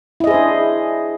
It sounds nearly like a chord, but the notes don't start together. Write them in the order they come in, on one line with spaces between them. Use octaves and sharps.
E4 D#5 G#4 C5 D4